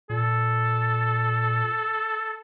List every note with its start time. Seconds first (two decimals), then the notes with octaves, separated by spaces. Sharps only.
0.10 A#2 A4